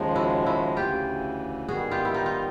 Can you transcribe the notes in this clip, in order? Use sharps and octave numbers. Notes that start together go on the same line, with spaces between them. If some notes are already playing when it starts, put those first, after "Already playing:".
Already playing: D#2 C#3 F3 G#3
E4 F#4
E4 F#4
D2 C#3 E3 F4 G4
G#2 D#3 G3 B3 F#4 G#4
F4 G4
E4
D#4 F4
F4